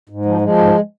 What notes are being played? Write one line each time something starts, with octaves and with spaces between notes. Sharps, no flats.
G#2
F3
F3 G#3
G#2